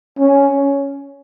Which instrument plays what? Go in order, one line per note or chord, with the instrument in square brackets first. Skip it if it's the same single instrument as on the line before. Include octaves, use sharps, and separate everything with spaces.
[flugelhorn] C#4